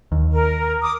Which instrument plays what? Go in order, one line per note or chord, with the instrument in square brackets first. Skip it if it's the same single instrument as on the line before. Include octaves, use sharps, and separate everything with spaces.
[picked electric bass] D#2
[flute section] A#4
D6 D#6